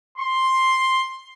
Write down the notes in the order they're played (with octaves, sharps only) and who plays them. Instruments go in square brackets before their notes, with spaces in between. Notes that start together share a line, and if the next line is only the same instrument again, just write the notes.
[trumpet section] C6